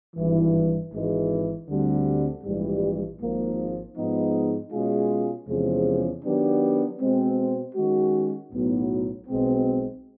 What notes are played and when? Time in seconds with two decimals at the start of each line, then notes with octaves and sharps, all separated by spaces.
0.16 G#1 G2 E3
0.92 G#1 G#2 E3 G#3
1.68 D2 D3 G3 C4
2.44 A#1 G#2 E3 G3
3.20 G#1 G#2 F3 A#3
3.96 G#2 F3 G#3 B3 D#4
4.72 B2 G#3 C#4 F4 G#4
5.48 E2 C3 F3 G#3 C#4
6.24 D#3 F#3 B3 D4 G4
7.00 B2 G#3 C4
7.75 D#3 G#3 C#4 F#4
8.52 B1 A2 F#3 B3
9.27 B1 B2 G#3 C4